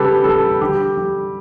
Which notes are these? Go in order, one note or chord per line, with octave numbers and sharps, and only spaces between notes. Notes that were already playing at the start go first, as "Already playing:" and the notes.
Already playing: C#3 G3 G4 A4 B4
G3 A4
D3 G4
G3